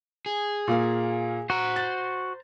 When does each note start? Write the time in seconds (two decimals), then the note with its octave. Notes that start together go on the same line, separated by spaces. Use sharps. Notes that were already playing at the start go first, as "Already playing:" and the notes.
0.26 G#4
0.67 A#2 A#3 F5
1.50 F#4 C5 A#5
1.76 A6